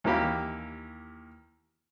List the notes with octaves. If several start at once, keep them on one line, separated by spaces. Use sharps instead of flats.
D#2 E3 A#3 G4 B5